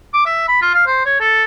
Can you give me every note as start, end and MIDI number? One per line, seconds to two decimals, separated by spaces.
0.14 0.23 86
0.26 0.46 76
0.48 0.61 83
0.62 0.74 65
0.74 0.86 77
0.87 1.04 72
1.06 1.17 73
1.20 1.44 69